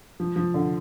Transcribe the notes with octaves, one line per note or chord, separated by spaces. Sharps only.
F3
F3
D3